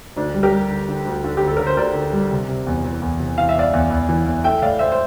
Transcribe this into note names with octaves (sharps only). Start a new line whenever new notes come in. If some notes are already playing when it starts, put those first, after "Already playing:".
D2 D4
G3
G4 A#4
G3
D3
D3
D2
D3
D2 G4
A4
D3 A#4
C5
D2 A#4 D5
D3
G3
C3
C3
E2
E3
E2
C3
E3 F5
E5
E2 D5 F5
E2
E2
E3
E2
A3 E5 G5
A2 D5 F5
A2 C5 E5
C5